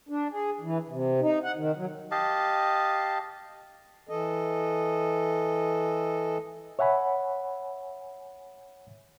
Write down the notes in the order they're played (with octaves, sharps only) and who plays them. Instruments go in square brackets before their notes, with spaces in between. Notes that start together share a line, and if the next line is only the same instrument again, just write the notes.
[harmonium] D4
G#4
E3
C3
D#4
F#5
D#3
F#3
[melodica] G4 D#5 F5 A5
[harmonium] E3 A4 D#5
[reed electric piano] C#5 E5 F#5 G#5 B5